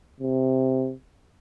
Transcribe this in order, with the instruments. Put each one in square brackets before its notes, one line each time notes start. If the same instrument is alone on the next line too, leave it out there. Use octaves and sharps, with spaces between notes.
[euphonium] C3